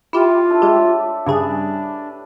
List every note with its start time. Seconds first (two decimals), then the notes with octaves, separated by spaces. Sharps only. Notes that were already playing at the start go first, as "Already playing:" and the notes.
0.13 E4 F4 G4
0.50 A3 D4 E4
0.62 G#3 G4 F5
0.75 D4 C#5 E5
1.26 G2 C#3 D4 G4 G#4 B4